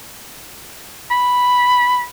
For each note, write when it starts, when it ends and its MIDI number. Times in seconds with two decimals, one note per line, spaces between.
1.11 2.05 83